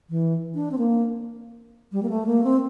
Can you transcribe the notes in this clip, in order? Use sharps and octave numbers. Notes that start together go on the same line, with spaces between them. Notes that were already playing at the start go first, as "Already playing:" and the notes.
E3
D4
C4
A#3
G3
A#3
A3
A#3
C4